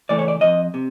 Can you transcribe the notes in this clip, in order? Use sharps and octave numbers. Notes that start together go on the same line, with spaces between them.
C#3 E3 A3 D5
C#5
D5
F2 D#5
C3